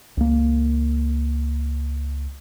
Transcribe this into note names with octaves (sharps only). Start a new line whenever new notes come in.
C#2 A#3